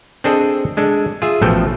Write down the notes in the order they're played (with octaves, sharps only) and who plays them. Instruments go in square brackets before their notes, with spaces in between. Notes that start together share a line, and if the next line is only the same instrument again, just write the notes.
[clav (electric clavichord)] C4 D4 G#4 A4 D#5
G#3 D4 A4
F4 G#4 E5
A1 B2 F3 A3 A4 G5